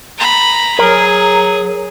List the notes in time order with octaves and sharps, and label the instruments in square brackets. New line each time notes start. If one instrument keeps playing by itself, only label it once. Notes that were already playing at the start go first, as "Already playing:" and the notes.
[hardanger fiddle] A#5 B5
[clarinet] F#3 [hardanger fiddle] G#4 [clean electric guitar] A#4